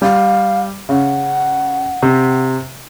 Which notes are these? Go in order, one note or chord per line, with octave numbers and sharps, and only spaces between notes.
G3 F5
C#3 F#5
C3